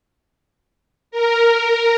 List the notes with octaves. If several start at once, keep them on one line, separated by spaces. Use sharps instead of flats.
A#4